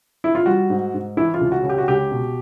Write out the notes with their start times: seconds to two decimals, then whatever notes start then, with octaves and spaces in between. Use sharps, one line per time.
0.24 E4
0.35 F4
0.46 G3 F#4
0.70 G#2
0.94 G#2
1.17 E3 E4
1.34 F4
1.41 C#2
1.52 F#4
1.63 C#3
1.69 G4
1.78 F#4
1.88 C#2 G4
2.11 B2